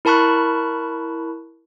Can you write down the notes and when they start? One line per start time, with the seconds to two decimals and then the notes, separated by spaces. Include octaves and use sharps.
0.05 E4 A#4 A5 B5 C#6 F#6